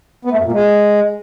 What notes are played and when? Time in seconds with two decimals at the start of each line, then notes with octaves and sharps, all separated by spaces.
0.25 B3
0.32 A3
0.38 F#2
0.45 A#2
0.52 G#3